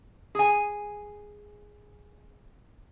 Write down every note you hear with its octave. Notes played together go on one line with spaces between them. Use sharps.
G#4 G#5